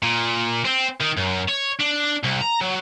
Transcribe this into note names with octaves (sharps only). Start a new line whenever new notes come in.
A#2
C4
D#3
F#2
C#5
D4
C2
A#5
F#3